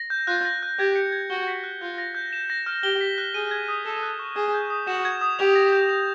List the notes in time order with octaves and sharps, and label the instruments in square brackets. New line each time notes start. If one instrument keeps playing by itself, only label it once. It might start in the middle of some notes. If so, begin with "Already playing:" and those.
Already playing: [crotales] A#6
G6
[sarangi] F4 [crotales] F#6
[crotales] A#6
F#6
[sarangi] G4 [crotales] G#6
[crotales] C#7
G#6
[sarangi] F#4 [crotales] G7
[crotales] B6
F#6
[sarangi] F4 [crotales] G6
[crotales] A#6
G6
E7
A#6
F6
[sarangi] G4 [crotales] G7
[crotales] B6
F#6
[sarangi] G#4 [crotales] D#7
[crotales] G#6
D#6
[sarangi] A4 [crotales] E7
[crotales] F#6
C#6
[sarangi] G#4 [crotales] E7
[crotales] G6
D#6
[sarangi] F#4 [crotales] E7
[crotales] G#6
D#6
[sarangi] G4 [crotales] F7
[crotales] A#6
G6
F7